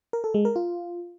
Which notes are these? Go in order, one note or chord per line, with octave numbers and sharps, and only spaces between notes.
A#4
A4
G#3
A#4
F4